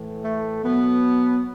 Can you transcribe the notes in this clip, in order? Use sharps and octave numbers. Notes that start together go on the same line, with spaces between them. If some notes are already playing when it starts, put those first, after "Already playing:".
Already playing: A2 E3
A3
B2 F#3 B3